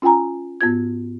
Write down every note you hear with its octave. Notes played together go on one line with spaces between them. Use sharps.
C#4 F4 G5 G#5 A#5
G#2 B3 F4 G#6